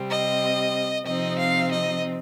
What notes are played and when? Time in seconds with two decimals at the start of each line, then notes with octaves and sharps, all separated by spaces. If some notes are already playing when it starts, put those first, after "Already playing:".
Already playing: C3 G3 C4
0.10 D#5
1.06 C3 F3 C4 D#4 D#5
1.38 F5
1.70 D#5